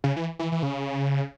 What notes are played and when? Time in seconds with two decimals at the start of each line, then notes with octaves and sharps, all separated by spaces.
0.04 C#3
0.16 E3
0.39 E3
0.52 E3
0.63 C#3